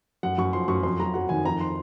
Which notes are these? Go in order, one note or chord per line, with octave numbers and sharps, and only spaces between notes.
F#2 F#5
F#2 C#6
F3 C6
F#2 C#6
F2 C6
F#3 A#5
F#3 F#5
D#3 G#5
F2 A#5
C6